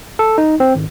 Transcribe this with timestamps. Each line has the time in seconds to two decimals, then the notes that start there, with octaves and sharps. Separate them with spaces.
0.19 A4
0.38 D#4
0.60 C4
0.75 G#1